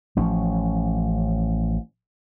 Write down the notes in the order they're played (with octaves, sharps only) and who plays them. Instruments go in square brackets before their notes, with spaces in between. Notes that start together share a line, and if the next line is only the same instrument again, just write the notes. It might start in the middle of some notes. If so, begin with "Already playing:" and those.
[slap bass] A1 F3 C#4